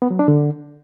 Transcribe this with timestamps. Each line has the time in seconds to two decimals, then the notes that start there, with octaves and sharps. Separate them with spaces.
0.02 B3
0.11 F#3
0.19 D4
0.28 D3